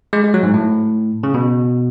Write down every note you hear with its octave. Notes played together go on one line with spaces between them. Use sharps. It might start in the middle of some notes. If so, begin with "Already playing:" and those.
G#3
G#3
F#3
G#2
A2
C#3
B2